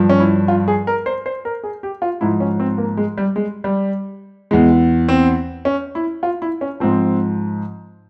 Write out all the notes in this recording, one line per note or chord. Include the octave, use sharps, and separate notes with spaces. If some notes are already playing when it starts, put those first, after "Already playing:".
Already playing: G2 F3
C#4
E4
F4
G#4
A#4
C5
C5
A#4
G#4
G4
F4
G#2 F3 E4
C#4
C4
A#3
G#3
G3
G#3
G3
E2 E3 G#3
C4
C#4
E4
F4
E4
C#4
G#2 F3 C4